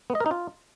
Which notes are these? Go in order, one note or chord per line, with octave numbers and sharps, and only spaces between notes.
B3
D#5
A#4
D#4
F4